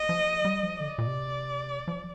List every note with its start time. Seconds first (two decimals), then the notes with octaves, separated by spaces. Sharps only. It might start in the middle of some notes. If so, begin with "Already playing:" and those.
Already playing: D#5
0.09 F3
0.45 G3
0.63 F3
0.80 D3 D5
0.98 A#2
1.07 C3
1.88 F3